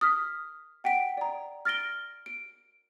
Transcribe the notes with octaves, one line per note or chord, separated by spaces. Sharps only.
D#6 F6 B6
F#5 G5 B6 D7
D5 A#5
F6 A6 A#6 D7 G7
D7